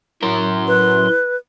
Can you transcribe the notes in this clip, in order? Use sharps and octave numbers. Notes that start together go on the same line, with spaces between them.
F#2 A2 A#4 C6
B4